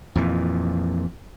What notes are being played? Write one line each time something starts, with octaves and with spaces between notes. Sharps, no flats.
F2 A#2 E3